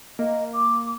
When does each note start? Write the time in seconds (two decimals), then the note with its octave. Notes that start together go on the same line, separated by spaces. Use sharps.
0.19 A#3 D#5
0.53 D6